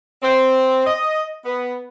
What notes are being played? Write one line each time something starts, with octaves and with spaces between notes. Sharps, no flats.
C4
D#5
B3